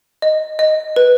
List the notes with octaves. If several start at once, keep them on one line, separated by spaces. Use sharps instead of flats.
D#5
D#5
B4